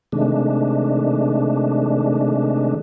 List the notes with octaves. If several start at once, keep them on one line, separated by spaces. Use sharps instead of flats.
C3 D#3 G#3 A3 D4